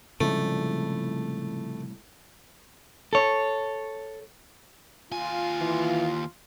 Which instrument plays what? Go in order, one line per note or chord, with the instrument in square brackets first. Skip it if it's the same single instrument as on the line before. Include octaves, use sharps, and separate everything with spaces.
[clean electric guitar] C2 A2 [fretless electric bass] C#3 F3 G#3 [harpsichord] A3
[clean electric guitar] A4 C#5
[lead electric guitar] D#2 G#5 [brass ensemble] F4
[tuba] E3